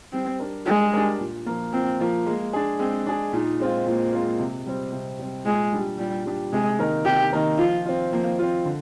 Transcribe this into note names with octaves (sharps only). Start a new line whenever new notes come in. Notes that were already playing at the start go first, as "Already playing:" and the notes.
G3 C4
D4 G4 A#4
G3 G#3
D4 G4 A#4
A#2
F3 A#3
A#2 C4
F3 A#3
G#3 A#3
D4 G#4
G#3 C4
D4 G#4
A#2 D#4
G#3 C4 F4
A#2 A#3
G#3 C4 F4
C3
G3 C4
C3
G3 C4
A#2 G#3
G3 D4 G4
A#2 G3
G3 D4 G4
C3 G#3
D#3 A#3 D#4 A#4
C3 G4
D#3 A#3 D#4 A#4
F3 F4
C4 F4
F3 A#3
C4 F4
D3